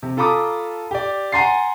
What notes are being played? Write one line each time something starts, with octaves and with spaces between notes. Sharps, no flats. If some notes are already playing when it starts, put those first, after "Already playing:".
C3
F4 A4 A#5 B5 D6 D#6
G4 D5
F#5 G#5 A#5 C6 A6 C7